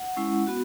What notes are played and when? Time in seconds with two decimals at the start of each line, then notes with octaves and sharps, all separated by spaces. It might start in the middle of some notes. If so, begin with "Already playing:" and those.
Already playing: F#5
0.17 G#3 C#4 E4
0.47 B3 F#4